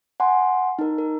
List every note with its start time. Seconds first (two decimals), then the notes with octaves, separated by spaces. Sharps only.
0.20 F#5 G#5 C6
0.79 D#4 A#4
0.98 A#4